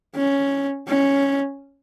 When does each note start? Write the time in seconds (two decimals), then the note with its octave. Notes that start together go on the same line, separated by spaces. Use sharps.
0.16 C#4
0.88 C#4